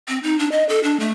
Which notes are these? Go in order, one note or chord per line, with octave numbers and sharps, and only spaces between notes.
C4
D#4
D4
D#5
A4
D4
A3